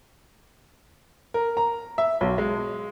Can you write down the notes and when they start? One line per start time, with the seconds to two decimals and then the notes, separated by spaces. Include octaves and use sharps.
1.34 A#4
1.57 A#5
1.98 E5
2.21 B1
2.38 G#3